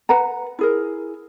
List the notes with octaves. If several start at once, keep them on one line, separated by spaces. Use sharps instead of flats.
B4 F#5 A#5
E4 G#4 A#4